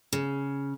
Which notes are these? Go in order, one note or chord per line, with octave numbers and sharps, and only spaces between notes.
C#3